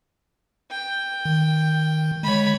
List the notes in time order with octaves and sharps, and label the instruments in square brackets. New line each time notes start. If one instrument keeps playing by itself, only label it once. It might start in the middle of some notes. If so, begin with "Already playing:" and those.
[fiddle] G5
[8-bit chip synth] D#3
[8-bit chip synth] D3 G#3 [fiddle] C#5 B5